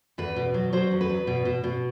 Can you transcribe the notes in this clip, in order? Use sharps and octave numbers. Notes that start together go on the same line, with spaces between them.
E2 B4
B2
F#3
F#3 C5
E2
B4
E2
B2
B2
B2